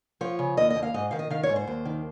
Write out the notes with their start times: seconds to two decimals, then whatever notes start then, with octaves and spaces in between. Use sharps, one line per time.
0.21 F3 C#5
0.39 C#3
0.57 D#2 D#5
0.70 D#5
0.76 D#2
0.83 F5
0.94 G#2 D#5
1.11 D#3 F5
1.19 D#5
1.30 D#3 F5
1.43 C#5
1.49 G#2
1.56 C5
1.67 D#2
1.85 D#3